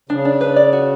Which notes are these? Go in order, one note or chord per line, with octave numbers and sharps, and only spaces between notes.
C#3 D4
D4
B4
D5
F#4